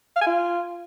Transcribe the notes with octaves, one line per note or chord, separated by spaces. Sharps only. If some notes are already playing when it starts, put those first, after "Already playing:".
F5
G#5
F4